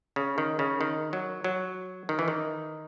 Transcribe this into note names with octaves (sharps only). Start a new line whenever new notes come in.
C#3
D#3
C#3
D#3
F#3
F#3
D#3
E3
D#3